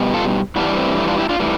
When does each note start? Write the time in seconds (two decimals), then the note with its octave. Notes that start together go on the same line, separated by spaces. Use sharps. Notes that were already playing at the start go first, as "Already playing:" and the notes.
Already playing: B2 G3
0.14 F4 A4
0.56 G2 E3 G3 B3 D4
0.77 A3 C4
0.97 A3
1.08 D4 F4
1.18 E4 G4
1.29 D4 F4
1.39 A2 E3 G3